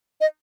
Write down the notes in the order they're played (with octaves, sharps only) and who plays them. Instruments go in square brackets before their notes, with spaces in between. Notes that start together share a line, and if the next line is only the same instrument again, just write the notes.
[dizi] D#5